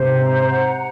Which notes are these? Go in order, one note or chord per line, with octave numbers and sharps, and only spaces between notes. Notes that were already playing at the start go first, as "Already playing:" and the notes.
Already playing: G#2 C3 C5
A#5
F#5